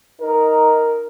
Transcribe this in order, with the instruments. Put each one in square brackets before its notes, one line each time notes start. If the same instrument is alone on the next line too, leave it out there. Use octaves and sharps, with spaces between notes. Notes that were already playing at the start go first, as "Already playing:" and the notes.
[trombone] D#4 [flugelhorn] A#4